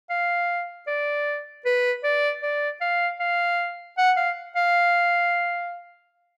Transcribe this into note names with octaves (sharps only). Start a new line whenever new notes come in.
F5
D5
B4
D5
D5
F5
F5
F#5
F5
F5